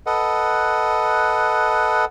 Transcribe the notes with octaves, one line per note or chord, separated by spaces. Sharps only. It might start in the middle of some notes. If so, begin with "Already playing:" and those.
A4 B4 D#5 F#5